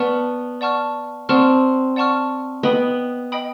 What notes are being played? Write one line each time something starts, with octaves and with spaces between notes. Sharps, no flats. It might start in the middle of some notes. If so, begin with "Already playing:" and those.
Already playing: B3 D5 F#5 A5 C#6 F6
D5 F#5 A5 C#6 F6
C4 D5 F#5 A5 C#6 F6
D5 F#5 A5 C#6 F6
B3 D#5 G5 B5 D#6
D#5 G5 B5 D#6